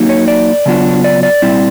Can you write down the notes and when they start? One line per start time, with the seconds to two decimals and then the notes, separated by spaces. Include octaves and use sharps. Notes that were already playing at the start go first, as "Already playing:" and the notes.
Already playing: F#3 A#3 D#4
0.09 C#5
0.28 D5
0.66 C#3 F#3 B3 D4 F4
1.04 D5
1.23 D5
1.42 A#2 G3 C4 E4